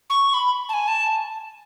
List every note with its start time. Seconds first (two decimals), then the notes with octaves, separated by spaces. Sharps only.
0.10 C#6
0.30 C#6
0.34 B5
0.69 A5
0.74 G#5
0.88 A5